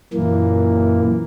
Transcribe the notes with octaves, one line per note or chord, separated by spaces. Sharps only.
F#2 A#2 E3 A#3